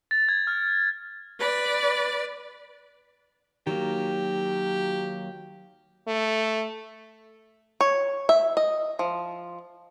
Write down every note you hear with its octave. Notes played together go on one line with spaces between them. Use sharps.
A6
G#6
F6
B4 D5
D#3 F#3 A#3 G4
A3
C#5
E5
D#5
F3